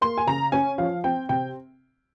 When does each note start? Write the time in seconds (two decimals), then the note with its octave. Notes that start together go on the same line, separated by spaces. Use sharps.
0.01 A#3 C6
0.18 G#5
0.27 C#3 A#5
0.52 C#4 G#5
0.78 F3 F5
1.04 C4 G5
1.29 C3 G5